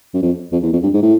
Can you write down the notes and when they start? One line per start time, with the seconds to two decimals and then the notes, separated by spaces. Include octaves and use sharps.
0.14 F#2
0.22 F2
0.52 F2
0.63 E2
0.73 F2
0.83 G2
0.94 G#2
1.03 A2